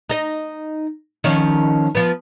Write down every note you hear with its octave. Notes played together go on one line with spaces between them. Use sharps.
D#4 D#5
D#3 F3 C#4
F3 B3